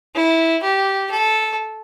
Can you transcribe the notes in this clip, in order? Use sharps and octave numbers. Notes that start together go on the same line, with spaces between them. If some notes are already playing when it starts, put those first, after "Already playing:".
E4
G4
A4